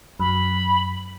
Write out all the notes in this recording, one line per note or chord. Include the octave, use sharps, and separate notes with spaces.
F#2 B5